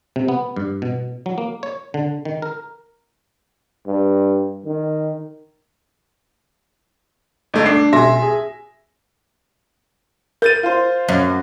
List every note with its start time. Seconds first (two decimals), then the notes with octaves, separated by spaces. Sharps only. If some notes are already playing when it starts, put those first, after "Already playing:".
0.16 C3
0.28 B3
0.56 G2
0.82 B2
1.26 F#3
1.38 A#3
1.63 C#5
1.94 D3
2.25 D#3
2.42 A#4
3.87 G2
4.66 D#3
7.54 G1 A3 D#4
7.66 D4 D6 C7
7.93 B1 E5 G#5 C6 A#6
8.22 G#4
10.42 A#4 G6 A6 D#7
10.63 F4 C5
11.08 F#2